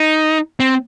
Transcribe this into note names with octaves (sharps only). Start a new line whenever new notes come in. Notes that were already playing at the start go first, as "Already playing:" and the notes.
Already playing: D#4
C4